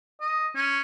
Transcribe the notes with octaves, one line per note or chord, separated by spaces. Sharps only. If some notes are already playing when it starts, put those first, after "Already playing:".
D#5
C#4